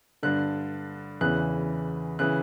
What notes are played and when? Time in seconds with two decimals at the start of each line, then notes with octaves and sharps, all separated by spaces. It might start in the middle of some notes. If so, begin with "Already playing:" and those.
0.23 G2 D3 F#6
1.21 E2 C#3 E3 F#6
2.19 C#3 E3 F#6